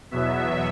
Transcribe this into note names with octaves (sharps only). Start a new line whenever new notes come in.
E2 B2 F#3 B3 E5